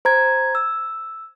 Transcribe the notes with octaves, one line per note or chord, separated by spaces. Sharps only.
C5 A#5 G#6
E6